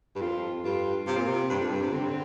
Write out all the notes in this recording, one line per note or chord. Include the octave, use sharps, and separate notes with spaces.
G2
F2 F4
G2 F4
C3 F4
A#2
C3
G2 D4
F2
G2
C3
D3 C4
C3
D3